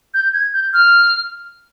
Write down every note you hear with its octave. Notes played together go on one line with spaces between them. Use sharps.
G6
G#6
G6
F6